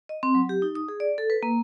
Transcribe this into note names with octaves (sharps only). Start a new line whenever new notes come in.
D#5
C4
F#3
G4
D#4
D#6
G#4
D5
A4
B4
A#3